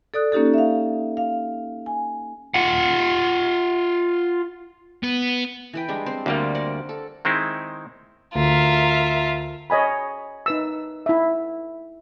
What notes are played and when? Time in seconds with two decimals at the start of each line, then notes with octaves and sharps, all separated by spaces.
0.14 A4 D5 D#6 F#6
0.32 A#3 C#4 D#4 G4 A4
0.54 E5 F5
1.17 F5
1.86 G#5
2.54 F4 F#5
5.03 B3
5.73 E3 B4 G5
5.88 G3 G#3 D4
6.06 C4 C5
6.26 D2 G3 A#3 C4 A5
6.55 A#4 D5 F#5
6.89 A4
7.25 D#3 G#3 C4 D#4 E4
8.35 D2 F4 A#4 E5
9.70 C#5 D#5 G#5 B5
10.46 D#4 B4 E6
11.06 E4 E5